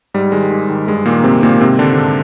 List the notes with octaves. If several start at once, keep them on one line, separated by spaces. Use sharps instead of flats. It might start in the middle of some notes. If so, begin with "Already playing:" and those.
G#2 G3
D#3 G#3
G#2
D#3
G2 G#3
A#2 D#3 A#3
G2 C3 C4
A#2 D#3 A#3
G#2 C3 C4
D3 D#3 D4
G#2